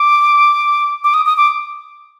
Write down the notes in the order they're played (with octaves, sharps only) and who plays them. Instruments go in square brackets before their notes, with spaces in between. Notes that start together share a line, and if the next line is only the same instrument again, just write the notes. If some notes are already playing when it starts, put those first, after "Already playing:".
Already playing: [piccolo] D6
D6
D#6
D#6
D6